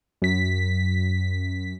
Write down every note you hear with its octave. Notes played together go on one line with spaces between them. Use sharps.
F#2 B6